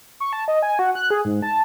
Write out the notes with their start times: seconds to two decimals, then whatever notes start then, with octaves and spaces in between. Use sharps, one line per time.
0.20 C#6
0.33 A5
0.48 D#5
0.62 G#5
0.79 F#4
0.95 F#6
1.11 G#4
1.25 G#2
1.42 A5